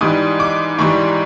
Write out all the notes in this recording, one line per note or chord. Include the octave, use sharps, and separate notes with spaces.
G#2 E3 G3 D#6
D6
G#2 E3 G3 C#6